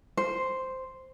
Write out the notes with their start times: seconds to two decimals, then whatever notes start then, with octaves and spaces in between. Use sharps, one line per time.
0.17 C5